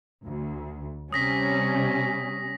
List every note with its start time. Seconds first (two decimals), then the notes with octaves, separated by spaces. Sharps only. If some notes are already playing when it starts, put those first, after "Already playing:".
0.24 D2
1.13 C3 G3 C#4 D#6 A#6 B6